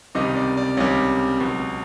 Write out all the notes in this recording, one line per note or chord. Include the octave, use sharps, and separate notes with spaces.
C#2 C3 D#3 G3 D#5
D5
D5
C#2 C3 D#3 G3 C#5
C#2 B2 F#3